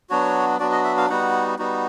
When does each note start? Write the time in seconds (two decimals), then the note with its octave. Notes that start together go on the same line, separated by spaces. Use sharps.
0.10 F#3 B3 D4 F#4 C#5
0.59 F#3 B3 D4 F#4 D5
0.72 D#5
0.84 E5
0.97 F5
1.09 G3 B3 D#4 F#4 F#5
1.58 G3 B3 D#4 F#4